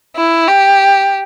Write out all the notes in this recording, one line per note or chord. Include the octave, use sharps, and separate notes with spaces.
E4
G4